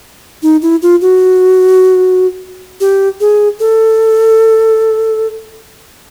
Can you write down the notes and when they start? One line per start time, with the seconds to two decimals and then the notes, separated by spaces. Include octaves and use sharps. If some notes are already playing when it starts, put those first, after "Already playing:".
0.43 D#4
0.62 E4
0.82 F4
1.01 F#4
2.80 G4
3.20 G#4
3.60 A4